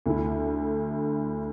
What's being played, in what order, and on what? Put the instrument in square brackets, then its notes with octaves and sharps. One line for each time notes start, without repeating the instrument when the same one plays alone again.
[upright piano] D2 D3 A3 E4